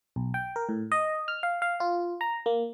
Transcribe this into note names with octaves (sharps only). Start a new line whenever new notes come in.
B1
G5
A#4
A2
D#5
F6
F5
F5
F4
A#5
A#3